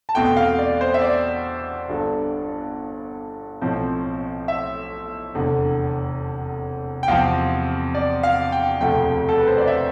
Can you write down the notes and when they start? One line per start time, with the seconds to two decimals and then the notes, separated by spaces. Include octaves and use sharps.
0.09 A5
0.15 E2 B2 A3 C4 G5
0.37 F5
0.59 D5
0.81 C5
0.94 E5
1.02 D5
1.89 G1 G2 D3
3.61 B1 A2 F3 C4
4.48 E5
5.35 F1 E2 D3
7.03 G5
7.08 E2 C3 F3 C4 F5
7.95 D5
8.23 F5
8.52 G5
8.81 E1 D2 C3 F3 A3 G5
9.29 A4
9.38 B4
9.47 C5
9.58 D5
9.67 E5